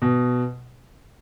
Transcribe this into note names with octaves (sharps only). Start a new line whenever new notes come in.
B2